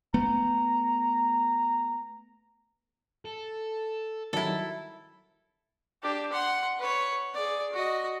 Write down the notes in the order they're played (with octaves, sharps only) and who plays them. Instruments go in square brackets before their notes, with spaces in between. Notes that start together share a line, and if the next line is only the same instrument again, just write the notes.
[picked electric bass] A3 B3 [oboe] A#5
[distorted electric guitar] A4
[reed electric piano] D#3 F#3 G3 [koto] E4 A4
[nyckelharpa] D4 G4
F#5 C6
B4 C#5
G#4 D5
F#4 D#5